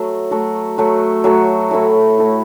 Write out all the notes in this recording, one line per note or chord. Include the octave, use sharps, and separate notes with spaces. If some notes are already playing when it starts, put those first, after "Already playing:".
Already playing: F#3 A3 F#4
F#3 A3 F#4
F#3 A3 F#4
F#3 A3 F#4
A2 A3 E4
A2 A3 E4